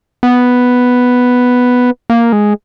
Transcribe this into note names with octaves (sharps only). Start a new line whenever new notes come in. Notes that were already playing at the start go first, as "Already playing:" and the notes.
B3
A#3
G#3